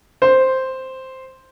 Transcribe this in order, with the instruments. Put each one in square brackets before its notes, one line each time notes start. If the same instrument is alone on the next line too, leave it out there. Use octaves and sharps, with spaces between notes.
[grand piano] C5